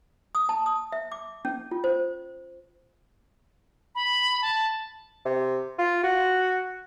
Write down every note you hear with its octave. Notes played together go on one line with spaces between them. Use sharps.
D#6
A5
D#6
E5
D6
C#4
F4
C5
B5
A5
C3
F4
F#4